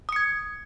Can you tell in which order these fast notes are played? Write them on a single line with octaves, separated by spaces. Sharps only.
D#6 C#7 G#6